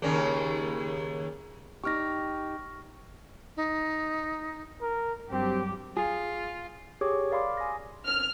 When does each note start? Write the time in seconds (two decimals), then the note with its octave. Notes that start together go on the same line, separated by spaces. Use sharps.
0.02 D#2 C#3 A#3
1.84 D#4 G4 C#6 F6 A#6
3.57 D#4
4.81 A#4
5.31 G2 F#3 C4 G4
5.97 F4 G#4
7.01 G4 G#4 C#5 C#6 D6
7.31 A#4 D5 F5 B5 C6 D6
7.57 G#5 D#6 A#6
8.06 F6